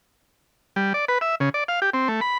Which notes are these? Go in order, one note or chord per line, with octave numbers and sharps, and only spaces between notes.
G3
D5
B4
E5
C#3
D5
F5
G4
C4
A3
B5